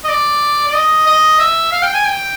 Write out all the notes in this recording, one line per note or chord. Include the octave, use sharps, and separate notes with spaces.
D#5
D5
D5
D#5
D#5
E5
F5
G5
G#5
G5